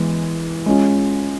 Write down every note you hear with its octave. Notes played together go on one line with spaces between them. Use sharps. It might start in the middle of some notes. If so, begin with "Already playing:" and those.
Already playing: E3 G#3 B3
G#3 C#4 F4